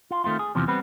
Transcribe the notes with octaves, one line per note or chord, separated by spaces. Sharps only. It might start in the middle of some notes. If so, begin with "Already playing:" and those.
F4
D#3 A3 C4 F4
G#4
E2 C3 E3 F3
G3 B3 C4 B4